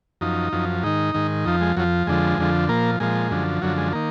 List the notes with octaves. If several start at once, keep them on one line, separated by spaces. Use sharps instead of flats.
F#2 F3 D#4
F#2 F3
G#2 D#3 D#4
G#2 D#3
F2 F3 D#4
G#3
F2 F3 F#3
F2 D3 F3 G#3
F2 D3 F3
A#2 F3 A#3
A#2 F3 G#3
F#2 D3 F3
F#2 D3 F3 F#3
G#3
D#3 A#3